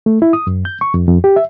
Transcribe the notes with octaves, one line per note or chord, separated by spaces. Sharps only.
A3
E4
D#6
F#2
G6
C#6
F2
F2
G4
E5